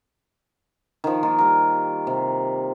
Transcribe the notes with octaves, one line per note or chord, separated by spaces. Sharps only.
D#3 F3
D#3 A#3 F4 A#4
G3 A#4
C3